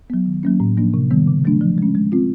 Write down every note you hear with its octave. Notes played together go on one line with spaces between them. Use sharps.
F#3 B3
D#3
F#3 A#3 C#4
A2
F3 A#3 D4
C3
D#3 G3 B3
C#3
F#3 A3 D4
F3
G#3 C#4
G#3
C4 F4